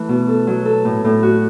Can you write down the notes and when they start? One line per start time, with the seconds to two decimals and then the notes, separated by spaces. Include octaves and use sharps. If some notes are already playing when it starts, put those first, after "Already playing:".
Already playing: E3 A3
0.09 B2
0.29 A4
0.47 F#3
0.65 A4
0.85 A2
1.04 A2
1.23 F#4